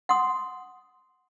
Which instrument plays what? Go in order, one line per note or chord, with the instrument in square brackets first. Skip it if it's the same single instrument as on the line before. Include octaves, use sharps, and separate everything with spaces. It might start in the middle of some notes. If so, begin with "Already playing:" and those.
[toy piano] F#5 C6 D#6